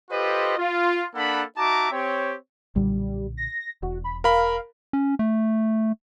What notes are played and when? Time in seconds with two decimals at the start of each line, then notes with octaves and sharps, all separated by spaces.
0.11 F4 G4 A4 B4 C5 D#5
0.58 F4
1.15 A#3 D4 A4 F#5 B5
1.57 D#4 F#4 E5 A5 A#5 D6
1.92 C4 G4 C#5
2.76 B1 A#2 D3 G3
3.37 A#6
3.83 E1 F#4
4.04 B5
4.24 A#4 F5 B5
4.93 C#4
5.19 A3